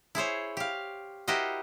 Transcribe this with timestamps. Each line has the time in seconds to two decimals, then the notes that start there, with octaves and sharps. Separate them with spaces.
0.15 E4 G#4 C5 C#5
0.57 G4 F5
1.28 E4 F#4 G4 A#4 C5 D#5